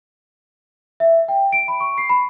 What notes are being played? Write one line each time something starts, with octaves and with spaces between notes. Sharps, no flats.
E5
G5
D7
B5
C#6
C7
B5